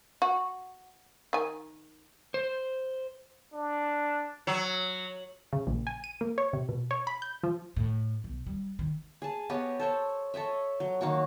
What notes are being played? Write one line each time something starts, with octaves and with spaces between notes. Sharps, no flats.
F#4
D#3 G#5
C5
D4
F#3
C#3
A#1
G#5
D#7
A#3
C#5
C3
B2
C#5
B5
G6
F3
A2
B1
G3
D#3
G#4 A5
B3 G4 C#5 D#5
A4 C5 C#5
A4 C#5 D#5 E5
F#3
D#3 A#3 F#4 C#5